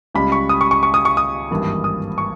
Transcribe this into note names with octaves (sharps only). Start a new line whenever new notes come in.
C#2 C#3 G3 B5
C#6
D#6
C#6
C#6
C#6
D#6
C#6
D#6
G#1 G2 E3 A#3
D#6
C#6